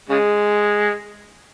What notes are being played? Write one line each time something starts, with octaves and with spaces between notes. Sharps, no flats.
C#3 G#3